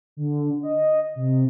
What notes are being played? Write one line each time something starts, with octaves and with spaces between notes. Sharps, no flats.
D3
D#5
C3